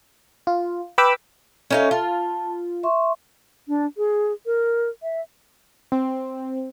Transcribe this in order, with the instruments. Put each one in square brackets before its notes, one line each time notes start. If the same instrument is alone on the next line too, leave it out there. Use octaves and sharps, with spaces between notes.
[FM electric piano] F4
B4 G5 B5 D6 E6
[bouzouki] C#4 D#4 F5 [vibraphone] A4 E5
[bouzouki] F4 [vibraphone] A5
[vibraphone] E5 C6 C#6
[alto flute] D4
G#4
A#4
E5
[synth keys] C4